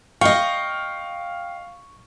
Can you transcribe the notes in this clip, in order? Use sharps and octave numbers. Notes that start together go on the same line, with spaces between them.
D#5 F5 G5 C#6